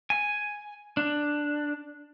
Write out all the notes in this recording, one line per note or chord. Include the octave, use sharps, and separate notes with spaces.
G#5
D4